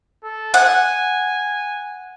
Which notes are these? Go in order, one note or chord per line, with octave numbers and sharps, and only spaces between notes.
A4
F#5 G#5